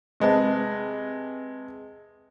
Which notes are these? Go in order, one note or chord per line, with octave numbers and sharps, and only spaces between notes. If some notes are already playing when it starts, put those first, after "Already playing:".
C3 G#3 B4 A5